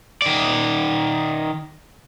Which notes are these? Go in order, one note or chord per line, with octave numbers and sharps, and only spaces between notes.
D#3 D5